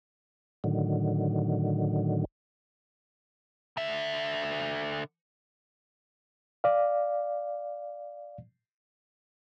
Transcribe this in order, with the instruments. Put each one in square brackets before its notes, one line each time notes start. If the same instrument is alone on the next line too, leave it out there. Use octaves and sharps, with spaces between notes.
[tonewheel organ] A2 D3 D#3 F#3
[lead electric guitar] D3 E5
[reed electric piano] D5 F5